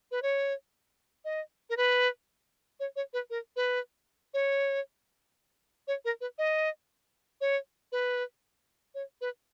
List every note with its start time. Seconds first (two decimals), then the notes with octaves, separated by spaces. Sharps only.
0.11 B4
0.22 C#5
1.25 D#5
1.70 A#4
1.77 B4
2.80 C#5
2.96 C#5
3.13 B4
3.30 A#4
3.56 B4
4.34 C#5
5.87 C#5
6.05 A#4
6.21 B4
6.38 D#5
7.41 C#5
7.92 B4
8.94 C#5
9.21 B4